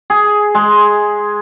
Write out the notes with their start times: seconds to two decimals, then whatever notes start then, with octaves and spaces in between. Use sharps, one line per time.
0.10 G#4
0.55 G#3